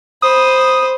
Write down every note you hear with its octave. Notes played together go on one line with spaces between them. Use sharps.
C5 B5 D#6